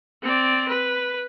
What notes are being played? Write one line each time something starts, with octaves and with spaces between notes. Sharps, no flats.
C4 D5
B4